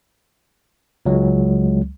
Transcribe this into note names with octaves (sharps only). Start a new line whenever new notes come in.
C#2 F#3 G#3